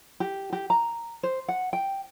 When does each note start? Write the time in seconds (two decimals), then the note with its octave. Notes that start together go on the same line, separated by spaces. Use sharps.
0.20 G4
0.53 G4
0.70 A#5
1.23 C5
1.48 F#5
1.73 G5